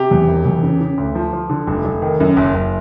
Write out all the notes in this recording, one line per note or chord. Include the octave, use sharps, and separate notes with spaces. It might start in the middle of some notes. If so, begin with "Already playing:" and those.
Already playing: C3 G4
E2
E1
E2
C#3
C#3
D2
F3
F3
D3
F1
F1
D#3
F#2
F#1
F#1